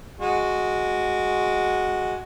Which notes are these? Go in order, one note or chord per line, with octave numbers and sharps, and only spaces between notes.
G#3 F#4